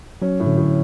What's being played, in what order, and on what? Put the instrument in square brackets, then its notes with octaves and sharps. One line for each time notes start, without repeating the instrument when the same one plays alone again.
[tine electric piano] F#3 [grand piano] C#4
[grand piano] A2
[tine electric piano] D3
[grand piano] A2